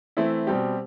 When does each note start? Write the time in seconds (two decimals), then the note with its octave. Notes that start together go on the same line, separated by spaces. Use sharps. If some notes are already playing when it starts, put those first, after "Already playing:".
0.17 E3 A3 C4 E4
0.47 B2 G3 C4 G4